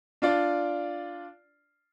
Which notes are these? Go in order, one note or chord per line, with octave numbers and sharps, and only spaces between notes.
D4 F4 D5